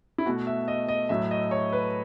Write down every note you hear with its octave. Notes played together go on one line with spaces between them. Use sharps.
E4
B2 A3 F#4
E5
D#5
D#5
A2 F#3 A3 E5
D#5
C#5
B4